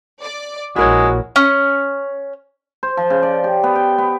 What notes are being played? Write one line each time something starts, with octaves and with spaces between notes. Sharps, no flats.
D5
A#1 G#3 E4 F#4 A#4 C#5
C#4
C5
F3
C#3
D5
G4
B3
G5
B3